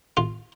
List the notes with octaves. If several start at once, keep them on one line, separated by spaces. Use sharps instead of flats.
F4